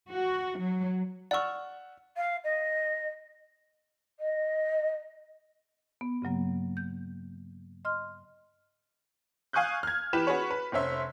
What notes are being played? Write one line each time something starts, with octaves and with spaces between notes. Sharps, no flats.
F#4
F#3
D5 F#5 C#6 E6 F6
F5
D#5
D#5
B3
G2 C#3 F#3 A#3
G6
D#5 C6 F6
F5 G#5 C#6 D#6 F#6 G6
F6 G#6
E3 G4 B4 E7
C#4 F#4 G#4 B4 C#5
B4
F1 C4 C#4 E5 C6